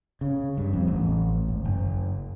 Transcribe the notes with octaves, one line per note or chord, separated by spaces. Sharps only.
C#3
G2
F2
A1
G#1
F#1